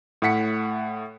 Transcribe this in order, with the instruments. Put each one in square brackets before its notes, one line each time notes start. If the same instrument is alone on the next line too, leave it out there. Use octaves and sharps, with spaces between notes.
[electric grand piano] A2 A3 F#5 B6 C#7